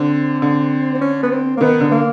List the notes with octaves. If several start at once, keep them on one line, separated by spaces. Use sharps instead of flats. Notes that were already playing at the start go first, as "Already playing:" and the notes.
Already playing: D3 C4
D3
C4
C#4
B3
C4
A#3
D#3 B3
D3
A#3